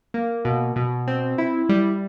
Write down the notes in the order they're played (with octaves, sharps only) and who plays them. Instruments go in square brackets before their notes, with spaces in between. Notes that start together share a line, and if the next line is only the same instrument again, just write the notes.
[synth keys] A#3
B2
B2
C4
E4
G3